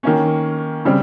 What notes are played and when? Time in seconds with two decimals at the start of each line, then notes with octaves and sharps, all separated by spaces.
0.03 D#3 A#3 C#4
0.85 C#3 G3 C4